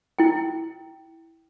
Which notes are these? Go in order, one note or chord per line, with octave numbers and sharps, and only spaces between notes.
E4 G5